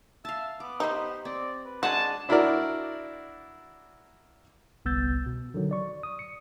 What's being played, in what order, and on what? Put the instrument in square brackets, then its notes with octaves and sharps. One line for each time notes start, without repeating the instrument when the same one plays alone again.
[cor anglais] E5 [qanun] F5 A5
[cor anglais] B3 [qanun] D6
[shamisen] D#4 [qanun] G4 C5
[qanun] C4 [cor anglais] D5
[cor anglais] B4
[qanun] G#3 D4 G#5 [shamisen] F#4 [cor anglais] F#5 [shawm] A5
[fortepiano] D4 E4 F#4 A#4 D5
[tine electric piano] G1 C2 B3 E6 G6 A6
B2
D3 D#3 F#3
D5 C#6
D#6
C#7